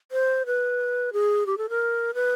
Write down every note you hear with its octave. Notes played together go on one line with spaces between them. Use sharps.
C5
B4
G#4
G4
A4
A#4
B4